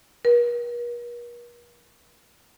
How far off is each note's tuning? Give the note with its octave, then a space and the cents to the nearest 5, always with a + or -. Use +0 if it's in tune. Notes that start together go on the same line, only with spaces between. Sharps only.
A#4 +45